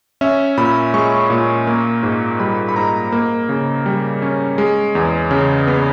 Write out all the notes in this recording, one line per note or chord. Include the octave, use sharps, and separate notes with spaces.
C#4 E5
A#2 B5
G#3 C#6
A#2
A#3
G#2
G3 B5
B5
G#2 A#5
A#3
C#3
G3
C#4
G#3
E2
C#3
B3